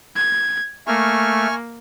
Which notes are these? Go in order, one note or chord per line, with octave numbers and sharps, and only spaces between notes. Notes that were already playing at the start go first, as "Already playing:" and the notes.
G#6
A3 A#3 G#5 C#6 F6